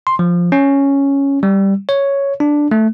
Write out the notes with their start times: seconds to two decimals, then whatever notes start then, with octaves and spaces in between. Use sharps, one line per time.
0.07 C6
0.19 F3
0.52 C#4
1.43 G3
1.89 C#5
2.40 D4
2.71 A3